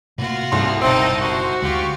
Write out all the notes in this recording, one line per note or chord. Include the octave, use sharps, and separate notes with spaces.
A2 C3 A#3 F4 F#4
C2 C6
F#1 B2 C4 D#4 A4
F#4 C5
D2 D3 G#3 F4 G4